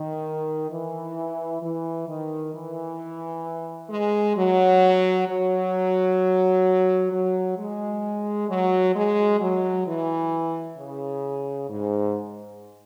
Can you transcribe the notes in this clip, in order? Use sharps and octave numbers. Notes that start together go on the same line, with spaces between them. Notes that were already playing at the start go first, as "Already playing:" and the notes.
Already playing: D#3
E3
E3
D#3
E3
G#3
F#3
F#3
F#3
G#3
F#3
G#3
F#3
E3
C#3
G#2